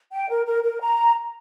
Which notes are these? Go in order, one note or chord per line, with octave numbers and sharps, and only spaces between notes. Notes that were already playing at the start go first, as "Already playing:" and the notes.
G5
A#4
A#4
A#4
A#5